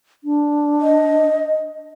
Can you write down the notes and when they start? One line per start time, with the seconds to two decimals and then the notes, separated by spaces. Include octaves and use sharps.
0.24 D4
0.81 D#5